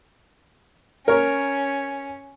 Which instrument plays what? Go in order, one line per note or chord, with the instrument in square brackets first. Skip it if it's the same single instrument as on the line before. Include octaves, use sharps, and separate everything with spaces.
[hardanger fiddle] C#4 [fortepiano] A#4 C#5